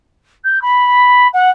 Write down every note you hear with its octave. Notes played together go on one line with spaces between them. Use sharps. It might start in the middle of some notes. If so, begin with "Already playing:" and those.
G6
B5
F#5